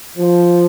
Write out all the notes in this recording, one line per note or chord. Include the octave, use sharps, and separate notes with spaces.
F3